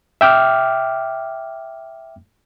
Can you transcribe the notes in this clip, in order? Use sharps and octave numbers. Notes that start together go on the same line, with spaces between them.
E5 G5 D6 F6